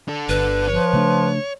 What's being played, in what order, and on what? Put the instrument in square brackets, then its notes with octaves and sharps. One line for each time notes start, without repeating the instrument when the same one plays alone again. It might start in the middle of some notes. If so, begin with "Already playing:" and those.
[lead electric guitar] D4 A4
[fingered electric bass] G1 [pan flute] B4
[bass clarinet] F3 [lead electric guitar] C#5
[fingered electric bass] C#3 A3 D4